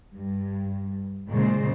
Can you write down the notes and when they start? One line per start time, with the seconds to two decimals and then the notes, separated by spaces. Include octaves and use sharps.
0.15 G2
1.30 F#2 A#2 C#3 G#3 C5